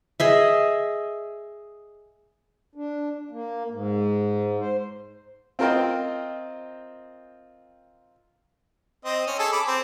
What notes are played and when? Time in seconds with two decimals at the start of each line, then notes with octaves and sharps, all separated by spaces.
0.20 G#4 D#5 E5
2.75 D4
3.30 A#3
3.71 G#2
4.59 C5
5.59 C4 F4 A#4 C5 D#5 G5
9.05 C4 D#5
9.27 C#4
9.39 G#4 A4 A5
9.52 B5 D6
9.68 C4